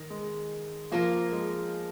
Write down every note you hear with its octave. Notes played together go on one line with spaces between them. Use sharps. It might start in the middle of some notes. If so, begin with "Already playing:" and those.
Already playing: D#3
G#3
F3 A#3 F4 A#4
G#3